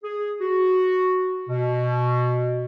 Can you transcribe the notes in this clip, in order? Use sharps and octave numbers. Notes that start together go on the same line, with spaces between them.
G#4
F#4
B2